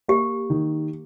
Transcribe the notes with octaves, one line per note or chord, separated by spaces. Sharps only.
A#3 G4
D#3